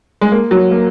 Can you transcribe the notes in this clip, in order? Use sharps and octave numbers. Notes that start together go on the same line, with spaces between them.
G#3
A#3
F#3
A#3